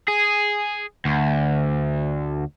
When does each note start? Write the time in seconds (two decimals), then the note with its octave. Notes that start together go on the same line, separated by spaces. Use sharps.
0.08 G#4
1.05 D2